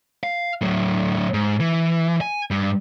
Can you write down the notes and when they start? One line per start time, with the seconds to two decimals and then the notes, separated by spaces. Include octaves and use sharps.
0.23 F5
0.61 A2 F#3
1.34 G#2
1.60 E3
2.21 G#5
2.51 G2